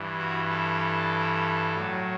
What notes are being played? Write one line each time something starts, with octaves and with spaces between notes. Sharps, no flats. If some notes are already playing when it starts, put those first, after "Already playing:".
Already playing: G2 E3
F#4
A4
A2 F#3